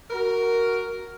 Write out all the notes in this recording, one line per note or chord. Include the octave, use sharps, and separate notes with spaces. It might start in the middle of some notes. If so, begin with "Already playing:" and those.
F#4 A#4